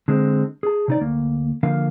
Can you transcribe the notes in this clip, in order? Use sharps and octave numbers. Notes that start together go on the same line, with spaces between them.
D3 G#3 C4
G#4 A5
C3 D#4 D5
D2 A#3
D3 F3 A#3 D4 F5